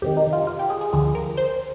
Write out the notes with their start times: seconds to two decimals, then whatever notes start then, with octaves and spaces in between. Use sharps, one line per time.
0.02 F2 C3 D#3 G4
0.17 D#4
0.33 F4
0.47 F4
0.59 G4
0.70 G#4
0.81 G#4
0.93 D2 D3 F3 G#4
1.15 A#4
1.37 C5